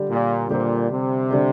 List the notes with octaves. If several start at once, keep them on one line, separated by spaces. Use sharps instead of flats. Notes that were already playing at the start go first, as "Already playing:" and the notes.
Already playing: D3 G3 D4 G4
A#2
A#2 D3 G3 D4 G4 C5
C3
D3 G3 D4 G4 C5